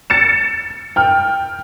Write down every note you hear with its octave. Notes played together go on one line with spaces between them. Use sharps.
A6 C#7 E7
G5 F6